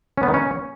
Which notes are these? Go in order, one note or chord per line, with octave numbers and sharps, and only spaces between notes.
C#4
B3
D#3
C#4